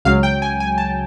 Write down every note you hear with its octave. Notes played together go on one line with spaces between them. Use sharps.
C#2 C#3 F#3 F5
G5
G#5
G#5
A5